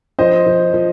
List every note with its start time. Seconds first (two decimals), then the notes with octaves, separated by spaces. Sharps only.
0.19 F3 C5 D#5
0.46 F3
0.74 F3